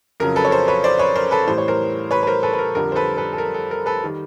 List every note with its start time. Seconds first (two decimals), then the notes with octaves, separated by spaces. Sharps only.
0.20 F2 C#3 F#3 A#4
0.36 A4 B4
0.45 C#5
0.51 A#4 C5
0.68 B4 C#5
0.84 C5 D5
0.99 B4 C#5
1.16 A#4 C5
1.31 A4 B4
1.47 A2 E3 G3 C5
1.58 C#5
1.68 A#4 C5
2.11 B4 C#5
2.23 B4
2.27 A#4 C5
2.43 A4 B4
2.53 B4
2.59 A#4
2.75 F2 D3 G3 A#4
2.92 C5
2.96 A4 B4
3.17 A4 B4
3.33 A4
3.38 A#4
3.54 A4
3.71 A#4
3.86 A4 B4
4.04 D#3 G3